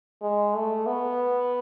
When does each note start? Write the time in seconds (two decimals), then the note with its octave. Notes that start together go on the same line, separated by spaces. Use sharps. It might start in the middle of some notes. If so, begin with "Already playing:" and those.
0.22 G#3
0.55 A3
0.86 B3